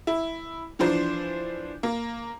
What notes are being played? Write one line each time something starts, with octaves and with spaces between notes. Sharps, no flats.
E4
E3 F3 D4 C5
A#3